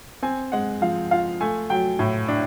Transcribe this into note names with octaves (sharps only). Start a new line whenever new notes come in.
C4 G#5
G#3 F#5
F3 F5
F4 F5
A3 G#5
F#3 G5
A2
D4